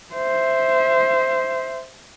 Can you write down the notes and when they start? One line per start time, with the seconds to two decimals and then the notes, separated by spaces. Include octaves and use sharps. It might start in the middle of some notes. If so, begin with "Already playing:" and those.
0.14 C5 E5